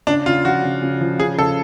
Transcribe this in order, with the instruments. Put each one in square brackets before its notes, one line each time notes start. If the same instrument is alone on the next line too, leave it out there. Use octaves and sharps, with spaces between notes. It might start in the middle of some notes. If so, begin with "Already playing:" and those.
[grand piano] C#3 [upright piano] D4
[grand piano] C#3 [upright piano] F4
[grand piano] F3 [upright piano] F#4
[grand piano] C#3
C#3
F3
[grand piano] C#3 [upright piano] G#4
[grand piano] C#3 [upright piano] A4